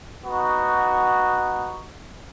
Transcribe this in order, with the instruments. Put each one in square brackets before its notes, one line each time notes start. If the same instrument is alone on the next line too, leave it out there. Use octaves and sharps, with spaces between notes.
[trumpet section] B3 D#4 F#4